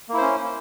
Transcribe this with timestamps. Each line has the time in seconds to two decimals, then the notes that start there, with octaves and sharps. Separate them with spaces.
0.09 A#3
0.13 E4
0.18 C5
0.22 C#4